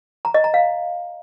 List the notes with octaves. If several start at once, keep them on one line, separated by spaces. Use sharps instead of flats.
A#5
D#5
A#5
F5